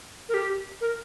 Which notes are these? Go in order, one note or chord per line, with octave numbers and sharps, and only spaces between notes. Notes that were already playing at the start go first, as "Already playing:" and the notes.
A#4
G4
A#4